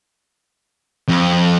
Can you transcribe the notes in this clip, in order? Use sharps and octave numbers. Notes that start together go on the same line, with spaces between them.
F2